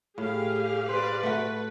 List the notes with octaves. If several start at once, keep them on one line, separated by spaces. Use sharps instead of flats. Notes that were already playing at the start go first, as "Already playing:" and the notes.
A2 G4 G#4 F5
B4 C5 D5
A3 F#4 B4